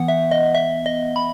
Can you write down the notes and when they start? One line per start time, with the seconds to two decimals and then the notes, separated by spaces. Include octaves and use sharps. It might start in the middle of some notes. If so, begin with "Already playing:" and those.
Already playing: E3 B3 F#5
0.08 E5
0.31 D#5
0.55 E5
0.86 D#5
1.16 B5